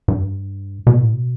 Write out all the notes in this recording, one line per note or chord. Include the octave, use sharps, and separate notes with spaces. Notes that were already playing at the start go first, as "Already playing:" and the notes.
G2
B2
A2
B2